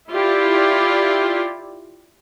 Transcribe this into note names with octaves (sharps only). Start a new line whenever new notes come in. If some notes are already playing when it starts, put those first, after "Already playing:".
E4 F4 G4 D5